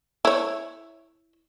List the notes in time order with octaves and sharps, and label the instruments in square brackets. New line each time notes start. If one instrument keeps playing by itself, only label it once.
[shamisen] E4 C#5